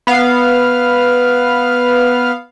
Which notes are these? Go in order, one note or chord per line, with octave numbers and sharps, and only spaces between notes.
B3 F5